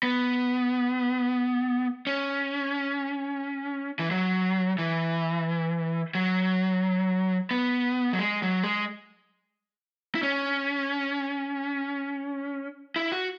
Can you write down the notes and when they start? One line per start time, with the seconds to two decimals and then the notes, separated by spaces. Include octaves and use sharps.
0.03 B3
2.07 C#4
3.99 E3
4.11 F#3
4.78 E3
6.15 F#3
7.51 B3
8.13 F#3
8.19 G#3
8.42 F#3
8.64 G#3
10.15 E4
10.23 C#4
12.96 E4
13.12 F#4